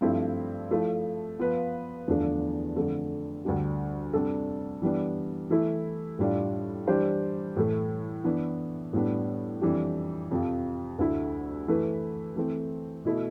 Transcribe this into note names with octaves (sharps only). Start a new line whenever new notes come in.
G2 F3 A3 C4 E4
F3 A3 E4
F3 B3 F4 B4
E2 D3 F3 A3 D4
F2 D3 A3
D2 D3 G3 D4 G4
C3 G3 D4 A4
E3 G3 B3 D4
E3 A3 E4
A2 G3 D4 F4
E3 G3 D4 G4 C5
A2 E3 A3
E3 B3 D4
A2 G3 B3 D4
F2 E3 G3 D4 G4
F2 C3 F3
D2 D3 A3 E4
E3 A3 E4 B4
E3 A3 C4
B2 A3 E4